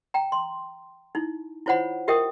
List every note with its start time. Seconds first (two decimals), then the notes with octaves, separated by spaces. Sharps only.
0.14 G5 A#5
0.32 C6
1.15 D#4 E4
1.66 E4 F4 C5 C#5 F#5 B5
2.08 F4 G4 A#4 E5 G5 D#6